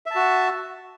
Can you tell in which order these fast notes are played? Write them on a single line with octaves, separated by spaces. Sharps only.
E5 A5 F#4